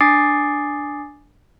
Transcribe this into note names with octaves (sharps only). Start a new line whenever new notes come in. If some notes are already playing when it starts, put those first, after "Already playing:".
D4 G#5 D6 D#6 A6 C7